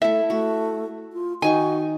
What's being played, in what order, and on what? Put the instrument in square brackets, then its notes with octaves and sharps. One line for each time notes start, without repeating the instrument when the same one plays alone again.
[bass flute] A3 [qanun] E4 A4 [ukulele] E5
[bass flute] A3 [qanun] F#4
[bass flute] F4
[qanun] D#3 D#4 C#6 [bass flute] F#4 [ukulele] G#5